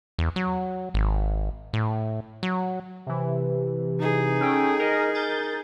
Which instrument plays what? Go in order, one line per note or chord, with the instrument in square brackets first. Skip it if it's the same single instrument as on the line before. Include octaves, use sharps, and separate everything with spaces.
[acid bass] E2
F#3
G#1
A2
F#3
[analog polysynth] C3 E3
[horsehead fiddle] D#4 G#4
[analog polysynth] C#4 A4 G5
A#4 D#5
A#4 G6 A6